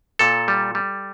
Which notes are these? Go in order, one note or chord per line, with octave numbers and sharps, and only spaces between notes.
A#2 A4
G3
G3